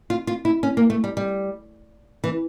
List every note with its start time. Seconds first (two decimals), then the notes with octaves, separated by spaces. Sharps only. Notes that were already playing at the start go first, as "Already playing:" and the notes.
0.10 F4
0.27 F4
0.45 E4
0.63 C#4
0.77 A#3
0.90 A3
1.04 G3
1.17 G3
2.24 E3